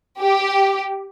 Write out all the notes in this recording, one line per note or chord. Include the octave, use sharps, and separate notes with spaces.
G4